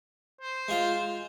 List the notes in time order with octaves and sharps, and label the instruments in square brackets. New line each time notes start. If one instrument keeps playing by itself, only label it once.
[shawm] C5
[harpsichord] G#3 F4